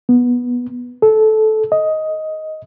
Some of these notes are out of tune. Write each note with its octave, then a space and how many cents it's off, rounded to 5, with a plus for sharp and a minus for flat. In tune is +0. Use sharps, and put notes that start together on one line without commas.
B3 -10
A4 -15
D#5 +10